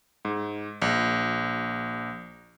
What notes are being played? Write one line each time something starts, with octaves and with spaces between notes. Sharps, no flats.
G#2
A#1